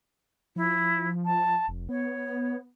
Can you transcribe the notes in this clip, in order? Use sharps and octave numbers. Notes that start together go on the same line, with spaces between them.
F3 E4
A5
F1
B3 C#5